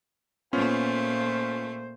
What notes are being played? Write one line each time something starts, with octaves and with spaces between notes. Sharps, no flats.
A#2 A3 B3 C#4 F4 C5